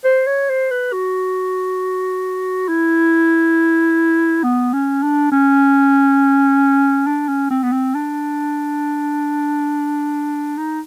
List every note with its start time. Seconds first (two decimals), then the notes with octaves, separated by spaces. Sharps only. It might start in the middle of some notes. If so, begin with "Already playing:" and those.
0.04 C5
0.27 C#5
0.49 C5
0.71 B4
0.93 F#4
2.68 E4
4.43 B3
4.73 C#4
5.03 D4
5.32 C#4
7.07 D4
7.28 C#4
7.51 C4
7.63 B3
7.72 C4
7.95 D4
10.57 D#4